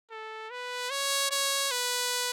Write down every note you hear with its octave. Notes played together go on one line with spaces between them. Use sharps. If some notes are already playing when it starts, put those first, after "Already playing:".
A4
B4
C#5
C#5
B4